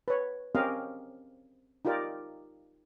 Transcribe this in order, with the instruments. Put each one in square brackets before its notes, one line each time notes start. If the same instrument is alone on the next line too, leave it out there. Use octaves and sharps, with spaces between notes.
[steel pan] B4 C#5
C4 C#4 G4 A#4 D#5 F5
D#4 F4 G4 A#4 D5